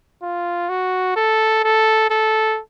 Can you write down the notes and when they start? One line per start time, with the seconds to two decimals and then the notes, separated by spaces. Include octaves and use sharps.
0.23 F4
0.69 F#4
1.16 A4
1.64 A4
2.10 A4